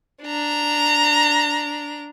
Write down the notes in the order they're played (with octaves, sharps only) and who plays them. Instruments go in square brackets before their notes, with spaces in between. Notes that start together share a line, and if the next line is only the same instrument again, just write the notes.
[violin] D4 A#5